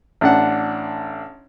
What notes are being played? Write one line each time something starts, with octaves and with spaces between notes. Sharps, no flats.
A1 D4 F#5